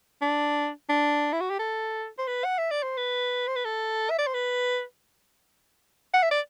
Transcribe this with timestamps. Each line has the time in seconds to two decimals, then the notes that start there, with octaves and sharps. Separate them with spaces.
0.22 D4
0.89 D4
1.33 E4
1.41 F#4
1.50 G4
1.59 A4
2.19 C5
2.27 B4
2.44 F#5
2.58 E5
2.71 D5
2.83 C5
2.97 B4
3.48 C5
3.56 B4
3.65 A4
4.10 E5
4.19 D5
4.27 C5
4.34 B4
6.14 F#5
6.23 E5
6.31 D5